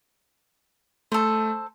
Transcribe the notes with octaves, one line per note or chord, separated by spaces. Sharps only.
A3 A4 C5